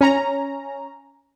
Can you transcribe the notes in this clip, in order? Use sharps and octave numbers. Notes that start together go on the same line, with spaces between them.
C#4 A#5